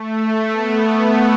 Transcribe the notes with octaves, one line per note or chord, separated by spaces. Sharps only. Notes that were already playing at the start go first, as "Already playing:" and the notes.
Already playing: A3
B3